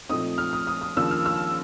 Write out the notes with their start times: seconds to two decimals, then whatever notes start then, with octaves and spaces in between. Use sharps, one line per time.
0.09 A#2 F3 A3 C4 D#4 D#6
0.38 F6
0.53 D#6
0.67 D#6
0.81 D#6
0.97 D#2 C#3 F3 A#3 D4 E6
1.11 F6
1.26 E6